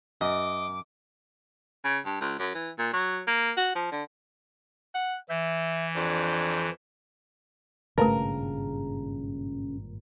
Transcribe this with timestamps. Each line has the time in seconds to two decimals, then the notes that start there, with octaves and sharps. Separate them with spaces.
0.21 F#2 D#5 D6
1.85 C#3
2.05 G2
2.21 C#2
2.39 F#2
2.55 E3
2.78 A#2
2.93 F#3
3.27 A#3
3.57 F#4
3.75 F3
3.92 D3
4.94 F#5
5.30 E3 E5 G6
5.96 F2 D4
7.98 G#1 G2 A#2 C#3 A3 A#4 B4 A5